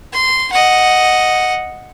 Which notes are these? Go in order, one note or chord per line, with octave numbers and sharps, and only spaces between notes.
C6
D#5 F#5